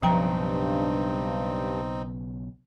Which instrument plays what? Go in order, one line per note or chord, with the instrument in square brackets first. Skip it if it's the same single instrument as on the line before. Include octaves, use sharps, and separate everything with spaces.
[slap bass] B1 C#3 [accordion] G2 [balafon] F3 G5 A#5 [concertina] C4 D#4